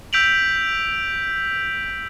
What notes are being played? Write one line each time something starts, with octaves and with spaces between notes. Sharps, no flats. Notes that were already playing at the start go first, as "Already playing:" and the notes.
E6 G6 B6 D7 F7 F#7